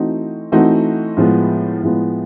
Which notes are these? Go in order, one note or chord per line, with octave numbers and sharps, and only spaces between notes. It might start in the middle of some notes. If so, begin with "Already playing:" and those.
Already playing: E3 A3 C4 D#4 F#4
E3 A3 C4 D#4 F#4
A2 F3 G#3 B3
A2 F3 G#3 B3